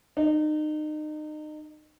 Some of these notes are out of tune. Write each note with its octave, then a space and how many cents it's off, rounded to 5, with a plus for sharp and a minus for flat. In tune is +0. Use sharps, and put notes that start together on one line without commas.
D#4 -30